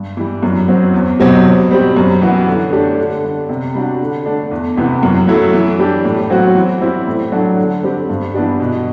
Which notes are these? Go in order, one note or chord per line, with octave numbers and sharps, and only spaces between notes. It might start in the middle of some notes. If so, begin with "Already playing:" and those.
Already playing: G2
E3 G3
F#2
F#3 C4
E2
B2 F#3 C4 G4
B2
G3 C4 G4
F#2
E3 B3 F#4
D3
A3 D4 G4
D3
G3 D4
C3
G3 D4 F#4
D3
A3 D4
E2
C3 E3 B3
F#2
F#3 A3 E4
E3
G3 D4 G4
A2
F#3 C4 F#4
E3
G3 C4 E4
A2
F#3 A3 D4 F#4
D3
G3 C4 G4
G2
E3 B3 D4 G4
B2